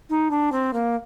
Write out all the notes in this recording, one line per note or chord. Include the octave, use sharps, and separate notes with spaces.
D#4
D4
C4
A#3